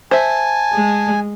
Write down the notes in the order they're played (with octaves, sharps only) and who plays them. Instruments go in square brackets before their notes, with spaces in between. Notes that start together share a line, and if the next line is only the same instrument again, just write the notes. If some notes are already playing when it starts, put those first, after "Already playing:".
[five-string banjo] C5 E5 [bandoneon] G#5 [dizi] A5
[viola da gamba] G#3